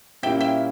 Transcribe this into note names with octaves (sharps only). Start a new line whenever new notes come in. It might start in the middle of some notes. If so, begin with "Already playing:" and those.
A#2 G3 A#3 C#4 E4 E5 G5
E5 G5